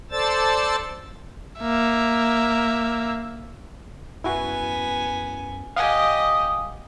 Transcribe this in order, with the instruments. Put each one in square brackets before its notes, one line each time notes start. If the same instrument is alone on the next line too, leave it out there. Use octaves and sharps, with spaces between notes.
[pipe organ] A4 C5 D5 A5 E6 A6
[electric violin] A#3 E5
[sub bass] F#2 [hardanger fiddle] B3 G#5 [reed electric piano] E4 F#4
[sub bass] D#1 [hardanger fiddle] G4 D#5 [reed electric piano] F5 F#5 G#5 [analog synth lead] D#6